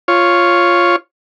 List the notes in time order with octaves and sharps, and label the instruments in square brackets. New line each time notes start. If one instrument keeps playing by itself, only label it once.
[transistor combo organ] F4 C#5